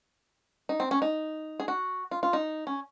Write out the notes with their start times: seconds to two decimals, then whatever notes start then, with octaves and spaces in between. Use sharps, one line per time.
0.69 D#4
0.80 C4
0.91 C#4
1.02 D#4
1.60 G#4
1.68 F#4
2.11 F4
2.23 F4
2.33 D#4
2.67 C#4